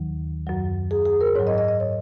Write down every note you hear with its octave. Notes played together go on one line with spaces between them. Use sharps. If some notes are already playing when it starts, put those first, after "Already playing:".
Already playing: D#2 D#3 F#3
F#2 F#3
G#4
G#4
A#4
G#2 F#3 C#5
D#5
D#5
D#5
C#5